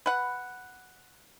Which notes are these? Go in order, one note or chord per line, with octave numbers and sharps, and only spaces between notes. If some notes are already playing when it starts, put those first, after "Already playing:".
B4 F#5